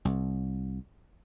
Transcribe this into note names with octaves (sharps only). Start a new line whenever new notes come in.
C2